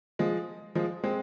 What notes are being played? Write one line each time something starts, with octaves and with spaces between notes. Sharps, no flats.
F3 G#3
F3 G#3
G#3 C4